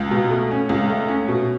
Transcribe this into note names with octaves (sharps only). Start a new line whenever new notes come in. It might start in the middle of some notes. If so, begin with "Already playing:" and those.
Already playing: C#2
B2
A3
C#4
C#2
A3
C#4
B2